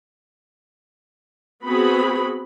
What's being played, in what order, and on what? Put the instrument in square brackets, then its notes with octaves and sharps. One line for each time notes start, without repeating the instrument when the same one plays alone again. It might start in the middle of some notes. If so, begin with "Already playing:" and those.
[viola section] B3 C4 F#4 G#4 B5